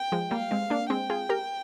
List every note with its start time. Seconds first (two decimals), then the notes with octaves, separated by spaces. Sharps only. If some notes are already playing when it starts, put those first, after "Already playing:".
Already playing: G5
0.12 F3 G#3
0.31 G3 A#3 F5
0.51 G#3 C4
0.70 A#3 D4
0.90 G#3 C4 G5
1.10 F4 G#4
1.29 G4 A#4